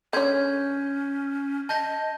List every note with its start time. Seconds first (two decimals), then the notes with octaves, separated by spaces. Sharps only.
0.13 D3 C#4 C#5 G6 G#6
1.69 D#5 A5 G6 A#6